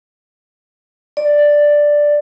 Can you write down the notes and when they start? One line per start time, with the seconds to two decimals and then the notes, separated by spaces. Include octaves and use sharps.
1.17 D5